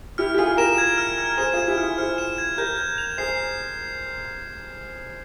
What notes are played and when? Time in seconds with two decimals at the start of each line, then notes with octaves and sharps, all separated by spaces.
0.18 E4 G4 F6
0.34 G4
0.38 F4 G#4 F6
0.58 G4 A#4 E7
0.78 G#6
0.98 F6
1.18 F6
1.38 G#4 C5 E7
1.53 F4 G#4 G#6
1.67 E4 G4
1.78 F4 G#4 F6
1.97 G#4 C5 F6
2.18 E7
2.38 G#6
2.58 G4 A#4 G6
2.78 G6
2.98 F7
3.18 G#4 C5 C7